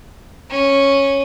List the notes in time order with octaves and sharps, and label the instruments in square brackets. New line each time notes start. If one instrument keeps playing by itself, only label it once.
[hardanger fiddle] C#4